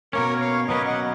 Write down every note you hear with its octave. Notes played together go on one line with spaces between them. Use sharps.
B2 A#3 C#4 A#4 C#5
C#5 F5
B2 F#3 A#3 C#4 B4 D#5
D#5 F#5